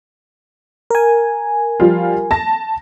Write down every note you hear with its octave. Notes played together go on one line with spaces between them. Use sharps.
A#4 G#5
F3 G3 F4
A5 A#6